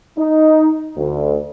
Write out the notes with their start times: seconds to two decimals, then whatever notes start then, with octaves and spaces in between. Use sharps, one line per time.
0.18 D#4
0.96 D2